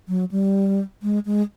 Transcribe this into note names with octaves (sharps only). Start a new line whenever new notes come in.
F#3
G3
G#3
G#3